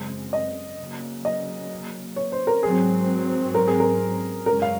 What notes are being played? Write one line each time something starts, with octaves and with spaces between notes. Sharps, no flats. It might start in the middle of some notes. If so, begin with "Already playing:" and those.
Already playing: F#2 C#3 G#3 C4
D#5
C#3 F#3 A#3
D#5
C#5
C5
A#4
G#2 F#3 C4 G#4
A#4
G#4
A#4
F#2 C#3 G#3 C#4 A#4
F5